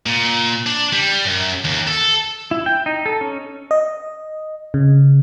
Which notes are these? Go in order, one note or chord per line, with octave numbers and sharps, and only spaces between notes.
A#2
D4
G3
F#2
D#2
A4
E4
G5
D#4
A4
C#4
D#5
C#3